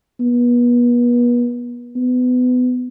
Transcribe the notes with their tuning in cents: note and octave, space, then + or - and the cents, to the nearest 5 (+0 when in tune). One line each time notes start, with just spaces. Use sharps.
B3 -35
B3 +25